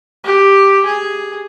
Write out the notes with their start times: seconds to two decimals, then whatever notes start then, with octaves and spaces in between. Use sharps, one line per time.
0.24 G4
0.85 G#4